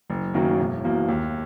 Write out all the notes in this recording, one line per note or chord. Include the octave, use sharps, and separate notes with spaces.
F#1
F#2 D#3 F#3 A#3
E1
E2 B2 A#3
D#2